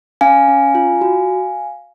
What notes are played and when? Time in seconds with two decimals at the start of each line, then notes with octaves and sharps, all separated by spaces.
0.21 C#4 F5 G#5
0.48 C#4
0.75 F4
1.01 F#4